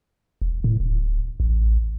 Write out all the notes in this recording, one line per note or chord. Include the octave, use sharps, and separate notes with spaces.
E1
A2
D1
A1